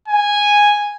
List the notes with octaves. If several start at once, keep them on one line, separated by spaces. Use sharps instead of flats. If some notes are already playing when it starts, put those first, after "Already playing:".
G#5